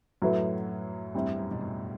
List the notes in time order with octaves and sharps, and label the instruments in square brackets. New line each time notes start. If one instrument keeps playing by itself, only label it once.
[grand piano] F#2 A2 [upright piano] F#3 A3 E4 B4
[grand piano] E2 G2 [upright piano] G3 C4 E4
[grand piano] F#2
B2
F#2 A2